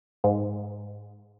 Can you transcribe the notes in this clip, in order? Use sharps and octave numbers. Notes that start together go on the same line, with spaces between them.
G#2